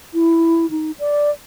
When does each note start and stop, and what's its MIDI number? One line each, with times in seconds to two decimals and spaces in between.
0.14 0.69 64
0.71 0.91 63
0.99 1.31 74